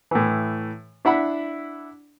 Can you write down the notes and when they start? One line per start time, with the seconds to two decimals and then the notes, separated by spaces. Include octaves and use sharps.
0.11 A2 E3
1.05 D4 E4 F#5 B5